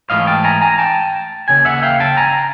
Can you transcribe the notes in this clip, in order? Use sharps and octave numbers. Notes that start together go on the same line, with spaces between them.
G#2 E3 A3 D#5 F5
G5 A5
G#5 A#5
G#5 A#5
G5 A5
D#2 C#3 G#5
E5 F#5
F5 G5
G5 A5
G#5 A#5